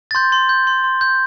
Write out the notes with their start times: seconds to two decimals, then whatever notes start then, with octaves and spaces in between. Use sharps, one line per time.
0.11 A6
0.15 C6 G6
0.32 C6
0.49 G6
0.67 C6
0.84 C6
1.01 G6